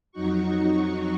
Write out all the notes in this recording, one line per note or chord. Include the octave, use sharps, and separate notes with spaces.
F2 F#3 D#4 F#4 C#6